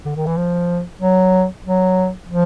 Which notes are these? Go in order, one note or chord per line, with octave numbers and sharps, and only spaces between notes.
D3
D#3
E3
F3
F#3
F#3
F3